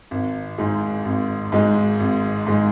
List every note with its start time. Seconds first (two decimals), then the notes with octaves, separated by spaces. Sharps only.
0.11 G#1
0.58 G#2 G#3 D#4
1.05 G#1
1.52 G#2 G#3 D#4
2.00 G#1
2.47 G#2 G#3 D#4